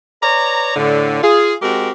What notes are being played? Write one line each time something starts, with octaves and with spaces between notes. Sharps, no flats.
B4 C#5 D5 A#5
A2 D3
F4 G#4
G#3 C4 F#4 G4 A#4